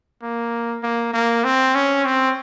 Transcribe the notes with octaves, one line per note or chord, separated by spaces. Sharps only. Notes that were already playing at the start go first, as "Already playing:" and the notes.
A#3
A#3
A#3
C4
C#4
C4